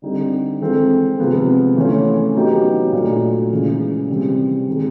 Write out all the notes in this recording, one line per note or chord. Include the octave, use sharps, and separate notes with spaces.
D3 G3 C4 D#4 G4
E3 G#3 C4 F4 A4
C3 F3 G#3 B3
E3 A3 C#4 F4
F#3 B3 D#4 G4
A#2 F#3 A3 D4
C#3 E3 G#3
C3 E3 G3 C4
C3 D#3 G#3